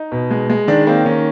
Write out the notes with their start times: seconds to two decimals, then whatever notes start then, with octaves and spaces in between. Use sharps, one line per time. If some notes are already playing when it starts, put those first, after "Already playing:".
Already playing: D#4
0.12 B2
0.31 G#3
0.50 G#3
0.68 D#3 D4
0.87 A#3 C4
1.05 D#3 C#4